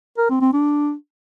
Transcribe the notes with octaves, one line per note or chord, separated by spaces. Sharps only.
A#4
C4
C4
D4